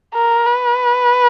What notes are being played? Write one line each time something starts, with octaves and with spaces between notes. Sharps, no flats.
A#4
B4